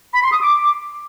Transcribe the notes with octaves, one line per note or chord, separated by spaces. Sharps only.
B5
C6
D#6
D6